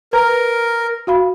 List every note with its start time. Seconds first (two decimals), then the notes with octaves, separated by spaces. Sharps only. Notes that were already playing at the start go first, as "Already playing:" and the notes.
0.13 A#4 B4 A#5
1.07 F#4 F5 B5